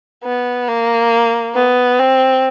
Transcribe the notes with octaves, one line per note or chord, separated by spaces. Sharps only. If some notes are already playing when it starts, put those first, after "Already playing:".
B3
A#3
B3
C4